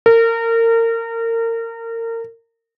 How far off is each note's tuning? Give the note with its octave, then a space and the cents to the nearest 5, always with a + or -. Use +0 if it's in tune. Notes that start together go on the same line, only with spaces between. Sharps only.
A#4 -30